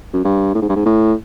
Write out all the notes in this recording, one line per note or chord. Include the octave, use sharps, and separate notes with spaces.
F#2
G2
A2
G#2
G2
G#2
A2